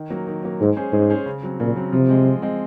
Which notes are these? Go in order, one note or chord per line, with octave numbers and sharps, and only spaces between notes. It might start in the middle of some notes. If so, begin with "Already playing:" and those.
Already playing: D#3
F#3 A#3
D#3
F#3 A#3
G#2 G#3
C#4 G#4 C5
G#2 G#3
C#4 G#4 C5
C#3
F#3 C4
A#2 C#3
F#3 C4
C3 F3
G#3 C4
F3
G#3 C4